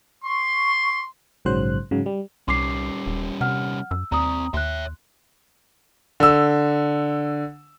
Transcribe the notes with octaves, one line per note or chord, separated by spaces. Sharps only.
C6 C#6
A#1 G#2 C#3 F#3 C5 F#6
G#2 C#3 F#3
G3
C2 G3 C#4 C6 D6 C7
D#1
C3 F#5 F6
F#2 E6
D#2 C4 D5 A#5 D#6
D#2 C#5 E5 C6 F#6
D3 E6